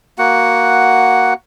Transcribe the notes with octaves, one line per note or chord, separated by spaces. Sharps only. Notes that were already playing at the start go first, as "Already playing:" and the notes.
A#3 F#4 F#5